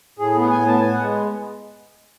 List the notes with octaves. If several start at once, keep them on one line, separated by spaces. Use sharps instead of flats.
A2 G#4
B3
A2 G#5
B3 A5
B3 G#5
F#5
G#3